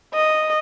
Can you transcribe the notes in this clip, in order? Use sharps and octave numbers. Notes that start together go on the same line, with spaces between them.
D#5